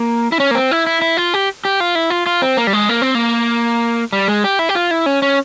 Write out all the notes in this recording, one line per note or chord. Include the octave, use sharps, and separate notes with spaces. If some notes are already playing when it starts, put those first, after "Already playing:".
Already playing: A#3
E4
C#4
A#3
C4
E4
E4
E4
F4
G4
G4
F4
E4
F4
F4
C4
A#3
G3
G#3
A#3
C4
A#3
G3
G#3
G4
E4
G4
F4
E4
C#4
C#4